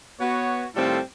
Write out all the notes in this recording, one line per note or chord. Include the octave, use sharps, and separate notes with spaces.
B3 F#4 C#5
A2 D#3 G3 C4 F4 A4